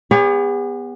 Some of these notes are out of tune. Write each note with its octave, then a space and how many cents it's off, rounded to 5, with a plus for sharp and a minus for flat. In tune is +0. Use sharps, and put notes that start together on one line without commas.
B3 +0 G#4 -45 C#5 +30